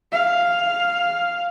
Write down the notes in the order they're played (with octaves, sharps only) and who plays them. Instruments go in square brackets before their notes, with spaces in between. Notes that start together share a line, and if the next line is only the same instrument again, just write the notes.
[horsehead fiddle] F5